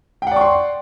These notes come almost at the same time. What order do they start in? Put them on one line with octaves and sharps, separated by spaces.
G5 F#5 D5 C#6 C6